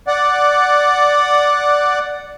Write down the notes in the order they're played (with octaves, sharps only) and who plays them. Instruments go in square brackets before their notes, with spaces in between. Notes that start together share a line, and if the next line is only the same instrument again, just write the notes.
[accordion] D5 F#5